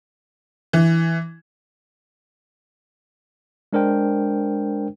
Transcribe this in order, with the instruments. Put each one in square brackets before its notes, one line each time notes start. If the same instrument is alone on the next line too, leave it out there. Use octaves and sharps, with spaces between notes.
[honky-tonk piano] E3
[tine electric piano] G#3 D4 A#4 C5 G5